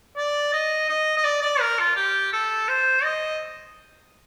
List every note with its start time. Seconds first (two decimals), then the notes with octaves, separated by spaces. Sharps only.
0.17 D5
0.53 D#5
0.89 D#5
1.17 D#5
1.24 D5
1.42 D5
1.60 A#4
1.79 F4
1.96 G4
2.33 A4
2.68 C5
3.04 D#5